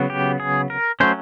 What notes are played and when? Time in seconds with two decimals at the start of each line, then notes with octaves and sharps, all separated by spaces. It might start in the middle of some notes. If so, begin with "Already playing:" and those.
Already playing: C#3 F#3 B3
0.10 G4
0.40 G#4
0.70 A#4
1.00 F#3 A3 C#4 C5